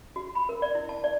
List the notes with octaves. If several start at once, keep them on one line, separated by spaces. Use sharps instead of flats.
F#4
B5
A#4
D5
E4
A5
D5